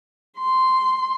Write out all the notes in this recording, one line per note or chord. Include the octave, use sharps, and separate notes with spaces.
C6